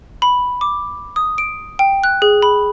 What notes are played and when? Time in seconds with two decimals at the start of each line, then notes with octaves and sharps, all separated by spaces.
0.22 B5
0.61 D6
1.16 D#6
1.38 D7
1.79 G5
2.04 F#6
2.22 G#4
2.42 B5